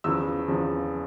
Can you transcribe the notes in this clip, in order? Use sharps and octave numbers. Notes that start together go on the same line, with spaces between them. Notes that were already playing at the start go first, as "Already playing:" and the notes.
E2 C#3 F3 E6
E2 C#3 F3